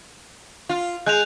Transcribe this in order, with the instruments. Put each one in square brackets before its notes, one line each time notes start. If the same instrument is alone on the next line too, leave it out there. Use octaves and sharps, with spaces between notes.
[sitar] F4
[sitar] G#3 [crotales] F#6 G6 F7